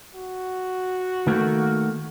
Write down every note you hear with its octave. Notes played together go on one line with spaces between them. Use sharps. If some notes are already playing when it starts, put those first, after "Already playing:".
F#4
D#3 A3 A#3